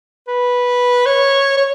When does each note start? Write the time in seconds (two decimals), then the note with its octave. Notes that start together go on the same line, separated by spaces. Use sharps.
0.28 B4
1.06 C#5
1.57 C#5